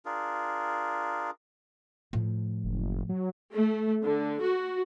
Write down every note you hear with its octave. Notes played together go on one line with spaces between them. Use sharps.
D4 F4 G#4 A#4
A2 F3
F#1
F#3
A3
D3
F#4